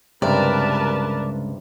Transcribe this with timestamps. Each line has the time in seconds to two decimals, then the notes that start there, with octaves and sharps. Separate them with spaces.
0.22 C#2 G2 C3 A#4 B4 D5 A5